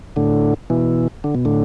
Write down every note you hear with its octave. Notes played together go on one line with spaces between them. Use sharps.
A2 D3
B2 E3
D3
B2
A2 D3